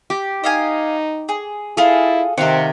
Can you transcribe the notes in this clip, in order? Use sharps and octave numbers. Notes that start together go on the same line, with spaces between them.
G4
D#4 D#5 F5 G#5
G#4
E4 F4 G#4 A4
C3 D#3 C4 F5 F#5